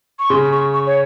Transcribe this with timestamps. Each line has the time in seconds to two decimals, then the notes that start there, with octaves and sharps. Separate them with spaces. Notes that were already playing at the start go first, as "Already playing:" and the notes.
0.19 C#6
0.30 C#3 C6
0.52 C#6
0.73 C#6
0.86 C#5